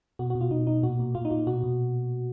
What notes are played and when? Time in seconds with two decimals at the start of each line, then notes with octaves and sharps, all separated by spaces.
0.19 B2 F#4
0.30 F#4
0.35 B2
0.41 F4
0.51 B2 D#4
0.67 B2 D#4
0.83 A#2 F#4
0.99 A#2
1.15 A#2 F4
1.25 D#4
1.31 A#2 F4
1.47 B2 F#4
1.63 B2